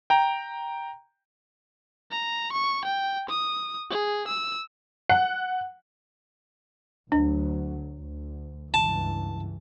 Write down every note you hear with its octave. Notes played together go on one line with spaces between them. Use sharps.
G5 A#5
A#5
C#6
G5
D#6
G#4
E6
F#5
D2 F#3 D4
D2
C#2 G2 E3 A5